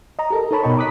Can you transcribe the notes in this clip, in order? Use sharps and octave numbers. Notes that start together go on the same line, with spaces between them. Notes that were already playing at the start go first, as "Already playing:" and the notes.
D#5 A#5
G4 A4 A#4
D#4 A#4 C#5 A5 B5
B2 D#4 D#5 G5 C#6
A#5 B5 D6 D#6 F#6 B6